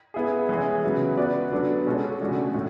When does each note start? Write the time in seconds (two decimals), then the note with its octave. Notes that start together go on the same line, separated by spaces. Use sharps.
0.14 B3 E4 G#4
0.49 E3 G#3 C#4 G#4
0.84 C#3 F#3 B3 E4
1.17 B3 F#4 B4 D5
1.52 D3 F#3 B3 D4
1.86 B2 G#3 C#4 F#4 A4
2.20 C#3 E3 A3 D4 F#4
2.54 A2